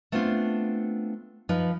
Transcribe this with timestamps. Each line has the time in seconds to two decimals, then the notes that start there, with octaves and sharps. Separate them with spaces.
0.12 A3 B3 C4 D4 F4
1.49 F3 D#4 B4